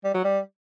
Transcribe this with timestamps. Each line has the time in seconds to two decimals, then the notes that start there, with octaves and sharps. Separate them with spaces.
0.04 G3
0.14 F#3
0.24 G3